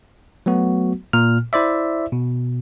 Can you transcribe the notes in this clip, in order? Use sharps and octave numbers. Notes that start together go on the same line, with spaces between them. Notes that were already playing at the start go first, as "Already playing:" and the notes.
F#3 A3 B3 F#4
A#2 F6
E4 C5 D5 E5
B2